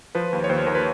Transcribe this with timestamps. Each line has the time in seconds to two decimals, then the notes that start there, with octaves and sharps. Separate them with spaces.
0.15 F3 B4
0.33 D#2
0.44 C#5
0.49 D#2 C5
0.66 D#2 A#4
0.75 B4